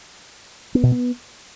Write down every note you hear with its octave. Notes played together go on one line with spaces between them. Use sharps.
B3
B2
B3